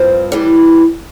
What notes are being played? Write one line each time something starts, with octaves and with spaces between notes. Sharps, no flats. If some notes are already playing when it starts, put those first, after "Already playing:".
Already playing: G2 F3 C4
E3 G3 D4